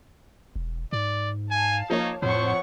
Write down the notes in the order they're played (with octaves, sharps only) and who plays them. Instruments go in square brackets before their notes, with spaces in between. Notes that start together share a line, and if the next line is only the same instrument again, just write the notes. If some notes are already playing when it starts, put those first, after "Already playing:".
[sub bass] E1
[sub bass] G#2 [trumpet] D5
[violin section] F5 A5 [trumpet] G#5
[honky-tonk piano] F3 A#3 C#5 [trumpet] D#4
[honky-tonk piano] F2 [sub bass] A2 [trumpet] C5 [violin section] C#5 F#5 C#6